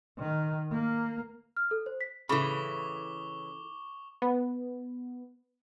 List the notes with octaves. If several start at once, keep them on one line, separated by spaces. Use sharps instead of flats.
D#3
A#3
F6
A4
C5
B6
C#3 E3 E4 A4 B5 C#6 D6 G7
B3